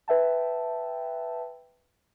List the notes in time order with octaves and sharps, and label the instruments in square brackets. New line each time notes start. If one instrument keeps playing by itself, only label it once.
[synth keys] B4 E5 G5 A5